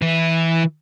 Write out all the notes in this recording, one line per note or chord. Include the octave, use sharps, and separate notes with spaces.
E3 E4